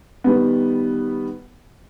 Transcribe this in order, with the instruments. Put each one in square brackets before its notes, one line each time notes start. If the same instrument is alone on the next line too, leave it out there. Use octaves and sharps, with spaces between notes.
[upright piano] D#3 G3 B3